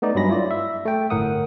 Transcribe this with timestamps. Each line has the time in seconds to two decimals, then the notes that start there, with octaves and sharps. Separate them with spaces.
0.02 A3 B3 D#4 D5
0.15 G2 F#3 G#3 G#4 B5 A#6
0.29 E4 F4 D5
0.51 E5
0.85 A3 G5
1.10 G1 A2 A#4 F#5 D#6